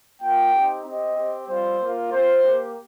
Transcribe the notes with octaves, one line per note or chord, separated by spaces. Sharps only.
A#3 F4 G5
C4 D#4 G4
C4 G4 D#5
C4 G4
G3 C4 F4 C5
A#3 F4
C4 F4 C5
A#3 G4